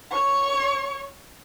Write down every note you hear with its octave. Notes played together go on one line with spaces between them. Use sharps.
C#5 C#6